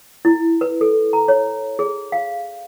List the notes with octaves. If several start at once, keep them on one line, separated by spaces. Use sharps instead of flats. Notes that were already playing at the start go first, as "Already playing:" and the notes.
E4
B4
A4
A#5
C#5
G#4
F5